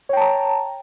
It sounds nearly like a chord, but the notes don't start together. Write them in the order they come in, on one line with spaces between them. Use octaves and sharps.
C#5 G5 A5 A#5